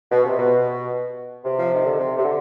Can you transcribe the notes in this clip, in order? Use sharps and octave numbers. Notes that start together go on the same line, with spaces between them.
B2
C3
B2
C3
F3
D#3
D3
C3
C3
D3